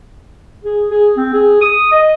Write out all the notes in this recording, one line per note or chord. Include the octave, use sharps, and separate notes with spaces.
G#4
G#4
C4
G#4
D#6
D#5